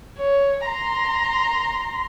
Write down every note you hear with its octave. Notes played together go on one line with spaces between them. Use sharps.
C#5
A#5 C6